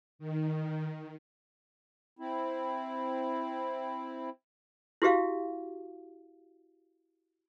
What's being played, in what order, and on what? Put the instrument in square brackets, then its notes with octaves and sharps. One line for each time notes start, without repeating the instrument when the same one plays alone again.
[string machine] D#3
[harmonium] C4 E4
[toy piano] E4 F#4 G4 E5 F5